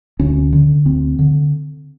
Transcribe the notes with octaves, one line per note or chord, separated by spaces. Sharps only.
D2 C#4
D3
D2 C4
D3